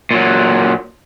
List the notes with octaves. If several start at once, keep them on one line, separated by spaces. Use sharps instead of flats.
A#2 F#3